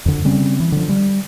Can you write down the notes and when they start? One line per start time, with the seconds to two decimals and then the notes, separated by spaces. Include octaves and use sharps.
0.06 F2 D3
0.25 C#3 G3 C4 C#4
0.60 E3
0.72 D3 F3
0.89 G3